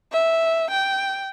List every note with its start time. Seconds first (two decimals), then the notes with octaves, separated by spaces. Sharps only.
0.12 E5
0.70 G5